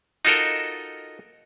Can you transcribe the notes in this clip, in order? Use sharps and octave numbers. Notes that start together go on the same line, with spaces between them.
D#4 F4 F#4 A4 A#4 D#5